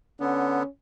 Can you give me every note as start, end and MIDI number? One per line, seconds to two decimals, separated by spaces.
0.20 0.63 50
0.20 0.63 59
0.20 0.66 61